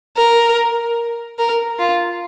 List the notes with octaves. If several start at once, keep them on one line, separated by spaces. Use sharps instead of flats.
A#4
A#4
F4